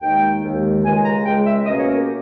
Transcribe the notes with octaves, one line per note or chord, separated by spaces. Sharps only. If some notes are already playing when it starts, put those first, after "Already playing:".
D#2 D#3 G#3 G5
D#2 D#3 G#3
C#2 C#3 G#3 G#5
A#5
C#2 C#3 G#3 G5
E5
B2 A#3 C#4 D#5
C#5
A#4
G4